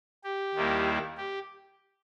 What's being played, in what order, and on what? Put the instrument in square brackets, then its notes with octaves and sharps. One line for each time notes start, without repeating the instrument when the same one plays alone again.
[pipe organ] G4
D#2 D#3 G3 A#3 E4
G4